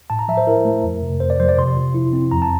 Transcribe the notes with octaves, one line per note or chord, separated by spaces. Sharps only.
A2 A5
A#5
F3 E5
C5
E4 A#4
A3
F2
C3
F2 C5
D5
F3 C5
D5
C3 C6
F3
E4
C4
F2 A#5
A5